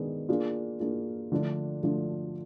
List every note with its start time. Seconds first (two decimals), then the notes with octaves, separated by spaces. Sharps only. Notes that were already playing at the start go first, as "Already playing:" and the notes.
Already playing: D#3 G#3 B3 D4
0.29 A#3 D4 F4 G#4
0.80 A#3 D4 F4 G#4
1.32 D3 F3 A3 D4
1.83 D3 F3 A3 D4